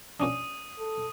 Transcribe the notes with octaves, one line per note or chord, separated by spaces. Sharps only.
A#2 C#4 D4 D#6 D#7
A4